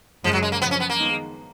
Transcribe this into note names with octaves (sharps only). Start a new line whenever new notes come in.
F#2 C#3 F3 G#3
F#3
G#3
A#3
F#2 C#3 F3 B3
C#4
B3
A#3
D#3 G#3 B3 D#4